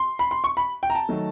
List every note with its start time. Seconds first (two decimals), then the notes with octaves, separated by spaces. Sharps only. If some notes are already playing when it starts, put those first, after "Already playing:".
Already playing: C6
0.19 B5
0.31 C6
0.44 C#6
0.57 B5
0.83 G5
0.90 A#5
0.95 A5
1.09 D#3 F#3 A3